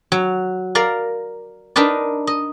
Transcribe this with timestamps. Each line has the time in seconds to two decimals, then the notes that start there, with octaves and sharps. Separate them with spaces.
0.12 F#3
0.75 A#4 D5 F5 A#5
1.76 D4 D#4 A#4 B4 D5
2.27 D#5